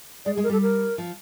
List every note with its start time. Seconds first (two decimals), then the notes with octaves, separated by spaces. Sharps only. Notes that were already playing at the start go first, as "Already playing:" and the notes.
0.25 G#3 D5
0.35 G#4
0.37 G#3
0.44 A#4
0.49 G3 A4
0.62 A#4
0.98 F3